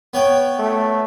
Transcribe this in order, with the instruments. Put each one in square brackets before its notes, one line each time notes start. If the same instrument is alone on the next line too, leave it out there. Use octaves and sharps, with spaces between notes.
[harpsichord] B3 C#5 G5
[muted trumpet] A3